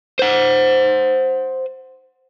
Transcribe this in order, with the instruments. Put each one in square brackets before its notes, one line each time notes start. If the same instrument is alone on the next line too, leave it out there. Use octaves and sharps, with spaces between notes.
[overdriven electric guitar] C5 F#5